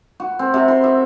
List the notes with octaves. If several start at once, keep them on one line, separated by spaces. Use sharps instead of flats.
F#4
C4
C3
C6
E5